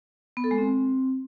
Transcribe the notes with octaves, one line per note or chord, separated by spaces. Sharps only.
B3
A4
G#3
C4